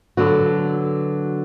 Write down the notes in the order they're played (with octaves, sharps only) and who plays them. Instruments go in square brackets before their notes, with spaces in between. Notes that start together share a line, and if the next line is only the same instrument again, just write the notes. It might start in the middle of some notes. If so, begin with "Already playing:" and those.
[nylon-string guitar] D3 F#3 B3 F#4